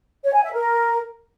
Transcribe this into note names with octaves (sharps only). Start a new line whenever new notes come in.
C#5
G#5
E5
A#4